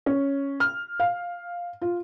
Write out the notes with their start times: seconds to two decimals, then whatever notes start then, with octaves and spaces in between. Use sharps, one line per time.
0.06 C#4
0.60 F6
1.00 F5
1.82 F4